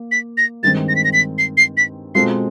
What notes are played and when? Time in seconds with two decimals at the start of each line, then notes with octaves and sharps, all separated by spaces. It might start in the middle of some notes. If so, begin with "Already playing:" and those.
Already playing: A#3
0.11 B6
0.37 A#6
0.63 G2 D#3 G#3 C4 A6
0.89 A#6
0.96 B6
1.04 A#6
1.13 B6
1.38 C7
1.57 C7
1.77 B6
2.15 B2 G#3 C4 F4 A4 C7